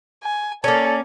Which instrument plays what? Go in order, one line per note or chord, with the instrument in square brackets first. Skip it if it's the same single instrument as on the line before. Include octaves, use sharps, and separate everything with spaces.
[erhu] G#5
[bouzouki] A#3 C#4 [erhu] A4 [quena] D5